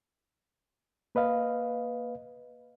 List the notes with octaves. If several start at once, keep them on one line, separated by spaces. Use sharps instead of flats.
A#3 B4 D#5 F5